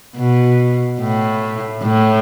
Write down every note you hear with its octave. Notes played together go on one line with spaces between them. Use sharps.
B2
A2
A2